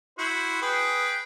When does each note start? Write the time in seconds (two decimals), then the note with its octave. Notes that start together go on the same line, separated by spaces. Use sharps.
0.19 E4 F#4 C5
0.62 G#4 B4 G5